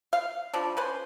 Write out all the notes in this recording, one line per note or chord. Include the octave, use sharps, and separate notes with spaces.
F5
F3 G3 D4
C#4 B4 C5